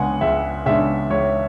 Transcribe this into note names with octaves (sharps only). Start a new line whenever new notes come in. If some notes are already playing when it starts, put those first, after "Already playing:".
Already playing: C#2 C#3 G#3 B3 D4 F#5 G#5
C#2 E5
C#3 G#3 B3 D4 E5
C#2 C#5